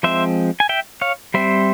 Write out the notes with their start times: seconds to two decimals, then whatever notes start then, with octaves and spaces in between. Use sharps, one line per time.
0.03 F3 G#3 C4 C5 E5
0.60 G#5
0.69 E5 G5
1.01 C#5 F5
1.34 G3 C4 C5 E5